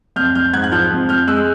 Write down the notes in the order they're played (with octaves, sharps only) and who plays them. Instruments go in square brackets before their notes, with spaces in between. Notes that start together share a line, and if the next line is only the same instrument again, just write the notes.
[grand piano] F2 F6 G6
F2 F6 G6
G#2 F#6 G#6
F#6
F3 F6 G6
F2
F2 F6 G6
G#3 E6 F#6